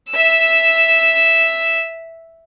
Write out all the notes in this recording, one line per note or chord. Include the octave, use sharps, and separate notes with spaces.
E5 E6